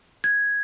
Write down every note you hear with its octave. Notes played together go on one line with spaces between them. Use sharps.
G#6